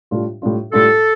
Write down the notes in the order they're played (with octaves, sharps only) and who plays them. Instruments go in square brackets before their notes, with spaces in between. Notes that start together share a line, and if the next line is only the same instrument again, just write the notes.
[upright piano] A2 G3 D4 F4
A2 G3 D4 F4
[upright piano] A2 G3 D4 F4 [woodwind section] A4